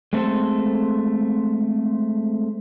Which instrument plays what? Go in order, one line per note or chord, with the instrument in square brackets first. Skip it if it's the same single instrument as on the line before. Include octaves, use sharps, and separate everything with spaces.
[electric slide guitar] G#3 A3 C4 A4